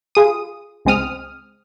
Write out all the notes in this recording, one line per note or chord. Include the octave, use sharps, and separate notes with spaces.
F4 G#4 D#6
C#2 G#3 C4 D#6 F6